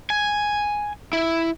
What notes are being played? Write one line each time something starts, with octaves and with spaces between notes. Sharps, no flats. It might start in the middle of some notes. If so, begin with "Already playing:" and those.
G#5
E4